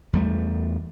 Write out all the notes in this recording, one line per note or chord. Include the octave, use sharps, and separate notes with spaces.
E2 G3 A3